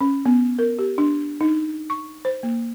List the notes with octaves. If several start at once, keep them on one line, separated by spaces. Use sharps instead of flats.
C#4
B3
A#4
G4
D4
D#4
C#6
C5
A#3